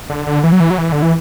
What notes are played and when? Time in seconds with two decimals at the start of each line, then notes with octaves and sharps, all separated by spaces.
0.10 D3
0.27 D3
0.44 E3
0.52 F#3
0.60 E3
0.70 F#3
0.78 E3
0.92 D3
1.02 E3